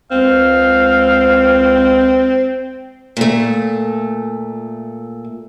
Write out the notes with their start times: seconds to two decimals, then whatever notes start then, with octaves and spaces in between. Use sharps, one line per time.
0.11 C#2 C4 F5
3.17 A#2 A3